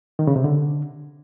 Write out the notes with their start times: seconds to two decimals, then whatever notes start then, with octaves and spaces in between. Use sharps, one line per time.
0.19 D#3
0.27 C#3
0.36 C3
0.44 D3